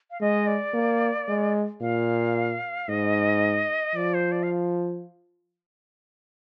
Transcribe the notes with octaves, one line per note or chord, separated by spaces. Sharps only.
F5
G#3 D#5
D5
A#3
G#3
A#2 F5
G#2 D#5
F3 D5
C5
D5
F5